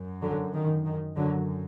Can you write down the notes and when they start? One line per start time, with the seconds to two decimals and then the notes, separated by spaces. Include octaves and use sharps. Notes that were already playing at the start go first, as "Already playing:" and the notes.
Already playing: F#2
0.22 D3 F#3
0.54 D#3
0.85 D#3
1.16 F#2 D3 F#3